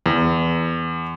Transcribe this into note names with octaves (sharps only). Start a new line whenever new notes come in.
E2